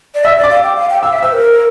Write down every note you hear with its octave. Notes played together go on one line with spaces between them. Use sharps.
D5
E5 E6
D5
D6
F5
G5
F5
G5
F5 E6
E5
C5 E6
A#4